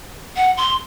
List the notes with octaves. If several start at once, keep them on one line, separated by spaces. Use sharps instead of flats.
F#5
C6